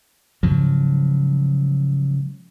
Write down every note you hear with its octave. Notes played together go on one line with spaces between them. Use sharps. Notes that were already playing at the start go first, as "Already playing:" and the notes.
G#2 C#3 F3 F#3